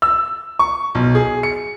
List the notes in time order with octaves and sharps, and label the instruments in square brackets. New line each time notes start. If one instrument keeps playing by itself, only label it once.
[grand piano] E6
C#6
B1
G#4
C#7